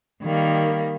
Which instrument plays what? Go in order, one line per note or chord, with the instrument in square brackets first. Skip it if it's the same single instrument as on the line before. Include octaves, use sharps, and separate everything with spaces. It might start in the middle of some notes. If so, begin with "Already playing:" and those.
[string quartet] D#3 G3 A#3